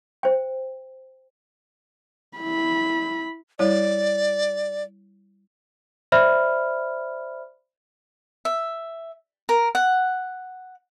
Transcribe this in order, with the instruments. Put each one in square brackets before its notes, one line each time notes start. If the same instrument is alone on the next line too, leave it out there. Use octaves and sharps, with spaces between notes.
[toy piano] C5 G5
[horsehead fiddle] E4 B5
[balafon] G3 E4 C#5 [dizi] D5
[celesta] C5 D5 E5 B5 F6
[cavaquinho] E5
A#4
F#5